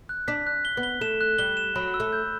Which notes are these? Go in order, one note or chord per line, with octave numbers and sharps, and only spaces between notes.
F#6
D4 B6
F#6
G7
B3
G7
A3 E7
F#6
G3 G7
E7
F#3 B5
E6
A3
G6